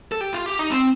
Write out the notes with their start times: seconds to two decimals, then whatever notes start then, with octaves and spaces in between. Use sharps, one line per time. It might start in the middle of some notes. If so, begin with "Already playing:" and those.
0.12 A4
0.21 G4
0.34 F4
0.46 G4
0.59 D#4
0.71 C4